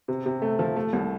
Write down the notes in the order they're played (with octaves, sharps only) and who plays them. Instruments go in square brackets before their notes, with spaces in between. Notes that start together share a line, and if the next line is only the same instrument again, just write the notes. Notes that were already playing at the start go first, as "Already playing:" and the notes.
[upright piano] C3
C3
A3
F3
A3
C2